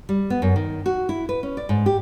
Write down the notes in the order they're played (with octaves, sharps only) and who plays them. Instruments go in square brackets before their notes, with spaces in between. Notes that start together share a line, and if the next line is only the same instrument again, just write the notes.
[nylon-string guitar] G3
B3
F#2
D#3
F#4
E4
B4
C#4
D5
G#2
G4